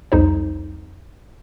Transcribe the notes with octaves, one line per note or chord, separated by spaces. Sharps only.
C2 F2 D#4 C5